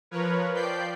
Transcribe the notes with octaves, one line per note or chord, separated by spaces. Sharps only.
F3 A#4 B4 C#5
F3 D5 G5 G6 B6 C7